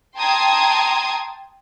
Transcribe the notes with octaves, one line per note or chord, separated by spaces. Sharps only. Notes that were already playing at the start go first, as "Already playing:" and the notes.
G5 A5 A#5 C6 D#6 G#6